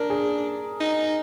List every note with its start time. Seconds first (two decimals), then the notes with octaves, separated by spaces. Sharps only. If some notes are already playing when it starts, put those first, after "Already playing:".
Already playing: D4 A#4
0.10 G#4
0.80 D#4